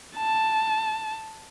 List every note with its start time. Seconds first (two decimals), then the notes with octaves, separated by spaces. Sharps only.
0.18 A5